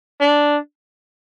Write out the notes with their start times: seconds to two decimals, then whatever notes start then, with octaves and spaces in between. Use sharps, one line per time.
0.21 D4